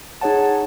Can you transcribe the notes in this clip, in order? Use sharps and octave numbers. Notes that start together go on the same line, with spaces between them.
D#4 G#4 C#5 F#5 A5